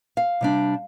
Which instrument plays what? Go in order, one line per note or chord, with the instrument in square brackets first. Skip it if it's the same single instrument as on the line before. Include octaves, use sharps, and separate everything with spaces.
[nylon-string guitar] F5
C3 G3 D4